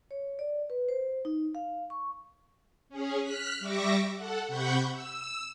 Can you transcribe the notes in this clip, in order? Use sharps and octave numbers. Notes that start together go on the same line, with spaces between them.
C#5
D5
B4
C5
D#4
F5
C#6
C#4 G#4
F6 F#6 B6
G3 E5 C#6 D6 A#6
A4 F#5
C3 F#5 B5 C#6 G6
E6